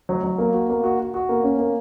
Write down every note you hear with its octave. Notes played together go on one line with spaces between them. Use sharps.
F#3
F#3
A#3
F#4
A#3
F#4
F#4
F#4
A#3
C#4
A#3